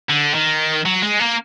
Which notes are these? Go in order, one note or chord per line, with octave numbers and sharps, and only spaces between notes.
D3
D#3
F#3
G#3
A#3